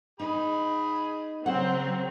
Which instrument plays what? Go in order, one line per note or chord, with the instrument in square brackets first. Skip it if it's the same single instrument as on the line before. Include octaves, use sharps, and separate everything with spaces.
[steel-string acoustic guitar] D#4 D#5 [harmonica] G#4 B5
[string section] C#3 F#3 C4 [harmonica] A#4 C#5 [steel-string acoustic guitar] C5 F#5